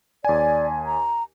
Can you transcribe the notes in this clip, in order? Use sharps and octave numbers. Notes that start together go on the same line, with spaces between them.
D#2 D5 G#5
A#5